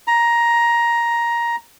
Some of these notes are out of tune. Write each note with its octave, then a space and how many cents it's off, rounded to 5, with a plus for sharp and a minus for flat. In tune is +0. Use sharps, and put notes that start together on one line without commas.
A#5 +10